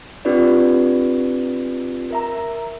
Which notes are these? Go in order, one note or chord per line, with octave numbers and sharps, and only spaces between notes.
C4 D4 F4 G4 B4 D5
A#4 E5 A#5